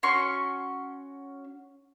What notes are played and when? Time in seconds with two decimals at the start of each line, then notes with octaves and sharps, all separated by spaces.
0.03 C#4 F#4 C6 C#6